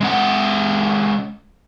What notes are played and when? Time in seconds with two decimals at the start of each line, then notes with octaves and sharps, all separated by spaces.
0.01 G#3 C#4 F#5